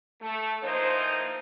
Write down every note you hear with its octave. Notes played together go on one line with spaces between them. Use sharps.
A3
E3 F3 A#3 D#4 C5